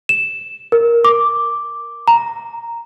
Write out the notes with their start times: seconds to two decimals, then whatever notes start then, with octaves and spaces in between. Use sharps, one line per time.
0.09 E7
0.72 A#4
1.05 D6
2.08 A#5